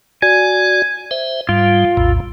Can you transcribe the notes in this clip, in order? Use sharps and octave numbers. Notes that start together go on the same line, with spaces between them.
F#4 D5 G#5
C5 E5
G#2 G3 F4
A#1 E2 A2